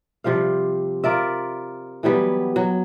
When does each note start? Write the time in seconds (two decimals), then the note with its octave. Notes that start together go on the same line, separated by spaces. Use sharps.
0.24 C3 F3 G3 F5
1.04 F4 A#4 D5 E5
2.03 E3 F#3 G3 B3
2.56 F#3